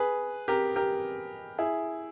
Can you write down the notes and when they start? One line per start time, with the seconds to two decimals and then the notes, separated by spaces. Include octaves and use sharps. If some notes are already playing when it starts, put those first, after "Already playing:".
Already playing: G#4 B4
0.48 G4 A#4
0.76 G4 A#4
1.59 E4 G#4